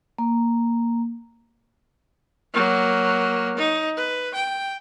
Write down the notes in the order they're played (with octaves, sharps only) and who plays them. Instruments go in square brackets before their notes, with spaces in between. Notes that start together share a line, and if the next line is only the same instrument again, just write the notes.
[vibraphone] A#3
[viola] F#3 A#3
D#4
B4
G5